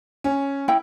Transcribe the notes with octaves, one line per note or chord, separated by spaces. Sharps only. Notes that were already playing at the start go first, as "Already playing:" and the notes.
C#4
E4 G5